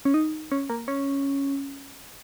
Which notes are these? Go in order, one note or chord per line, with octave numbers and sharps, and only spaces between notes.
C#4
D#4
C#4
A#3
C#4